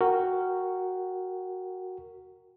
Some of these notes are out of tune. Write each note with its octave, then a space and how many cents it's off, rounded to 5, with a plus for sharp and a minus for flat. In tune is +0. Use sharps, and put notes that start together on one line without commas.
F#4 +0 A#4 -15 G5 +0